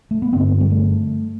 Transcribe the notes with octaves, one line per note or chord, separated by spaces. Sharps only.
A3
B3
G2 D3 C4
G3
A3